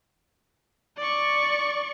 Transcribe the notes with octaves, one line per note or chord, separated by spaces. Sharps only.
D5 C#6